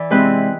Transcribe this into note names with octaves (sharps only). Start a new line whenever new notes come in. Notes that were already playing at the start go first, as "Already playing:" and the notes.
Already playing: E3 D5
C3 G#3 C4 E4 B4